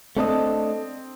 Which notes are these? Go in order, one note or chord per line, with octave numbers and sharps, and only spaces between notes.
A3 C4 D4 A4 D#5